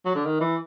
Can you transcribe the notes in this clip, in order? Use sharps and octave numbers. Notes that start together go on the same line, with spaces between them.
F#3
D3
D#3
E3